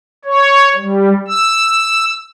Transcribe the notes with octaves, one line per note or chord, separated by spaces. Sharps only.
C#5
G3
E6